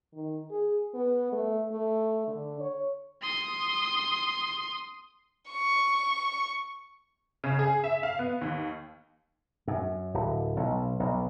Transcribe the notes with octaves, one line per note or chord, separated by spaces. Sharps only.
D#3
G#4
B3
A3
A3
D3
C#5
C6 D#6
C#6
C#3
G#4
E5
F5
B3
D#2
F#2
D1
B1
B1